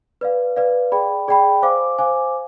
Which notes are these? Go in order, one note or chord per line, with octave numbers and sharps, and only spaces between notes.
B4 D5 F5
B4 D5 F5
G#4 D5 G5 B5
G#4 D5 G5 B5
C5 F5 G#5 D6
C5 F5 G#5 D6